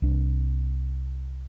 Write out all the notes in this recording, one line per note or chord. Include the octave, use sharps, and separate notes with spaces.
C2 D4